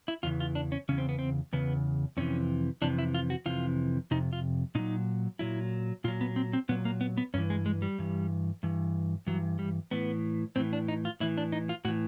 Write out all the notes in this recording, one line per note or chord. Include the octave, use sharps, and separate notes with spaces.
E4
E2 C#3 E3 F4
F4
D4
C#4
E2 C#3 C#4
C4
B3
C4
E2 C#3 B3
F2 C3 E3 C#4
F2 C3 E3 D4
E4
F4
F#4
F2 C3 E3 F4
F2 C3 D#4
F4
A#2 F#3 D#4
A#2 F#3 E4
A#2 F#3 F4
B3
C4
C4
A#2 F#3 B3
A#3
B3
B3
G2 E3 C#4
G#3
G#3
G3
G2 E3
G2 E3
G2 E3 F#3
G3
A2 E3 B3
A2 E3 C4
D4
D#4
F4
A2 E3 E4
D4
D#4
F4
A2 E3 F#4